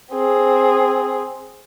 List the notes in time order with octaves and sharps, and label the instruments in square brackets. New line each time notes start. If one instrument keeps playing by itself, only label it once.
[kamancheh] C4 G#4